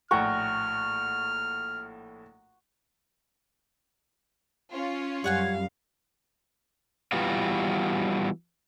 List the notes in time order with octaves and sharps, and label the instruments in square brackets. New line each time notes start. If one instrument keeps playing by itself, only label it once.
[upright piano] A#1 A2 G5 [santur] F#5 A#5 C#6 [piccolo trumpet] F6
[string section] C#4 F4
[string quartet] F#2 F5 [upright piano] G3 [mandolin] C#5 F#5 G#5
[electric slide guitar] E3 G3 B3 F4 F#4